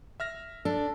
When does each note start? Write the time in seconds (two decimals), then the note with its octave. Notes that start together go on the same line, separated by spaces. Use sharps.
0.20 E5 F6 A#6
0.65 D4 A4